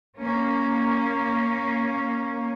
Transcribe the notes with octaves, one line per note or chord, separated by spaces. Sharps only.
A#3 C#4